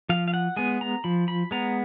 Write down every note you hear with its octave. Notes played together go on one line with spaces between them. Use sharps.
F3 F5
F5
F#5
G#3 B3 G#5
A#5
F3 B5
B5
G#3 B3 A#5